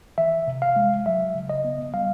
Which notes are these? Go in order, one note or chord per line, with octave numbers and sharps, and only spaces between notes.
E3 E5
C3
F5
G#3
F#3 E5
C#3
D#5
B3
G3 F5